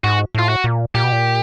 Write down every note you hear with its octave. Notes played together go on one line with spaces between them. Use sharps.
G#2 F#4
A2 F4
F#4
A#2
A#2 G4
B2
A#2